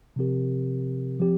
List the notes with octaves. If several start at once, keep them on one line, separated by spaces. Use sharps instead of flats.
C3 F3 C4 G4 A#4
F3 C4 G4